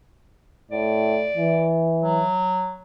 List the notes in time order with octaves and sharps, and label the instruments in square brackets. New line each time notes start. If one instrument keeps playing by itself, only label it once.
[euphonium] A2 [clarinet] D5
[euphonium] E3
[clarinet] F#3